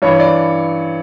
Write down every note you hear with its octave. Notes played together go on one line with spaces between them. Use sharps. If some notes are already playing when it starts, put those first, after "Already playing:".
G2 E3 C#5
D5